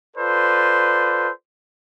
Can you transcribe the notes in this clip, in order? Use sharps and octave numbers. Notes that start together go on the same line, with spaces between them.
F4 A4 B4 C5 D5